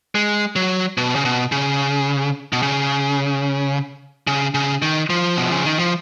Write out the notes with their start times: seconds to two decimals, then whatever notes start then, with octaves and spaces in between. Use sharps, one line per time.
0.15 G#3
0.56 F#3
0.98 B2
1.16 C#3
1.25 B2
1.52 C#3
2.53 B2
2.62 C#3
4.27 C#3
4.54 C#3
4.82 D#3
5.10 F3
5.37 B2
5.51 C#3
5.65 D#3
5.79 F3